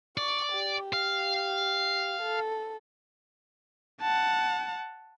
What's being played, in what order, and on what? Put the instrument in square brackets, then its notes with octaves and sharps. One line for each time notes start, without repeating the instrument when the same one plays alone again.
[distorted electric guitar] D5 [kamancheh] C#6
[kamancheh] G4
[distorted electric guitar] F5
[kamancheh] A4
[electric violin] F#5 A5